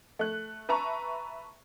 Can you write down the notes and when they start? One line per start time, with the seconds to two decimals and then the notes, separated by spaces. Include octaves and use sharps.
0.19 A3 F#6
0.69 B4 E5 A5 A#5 C#6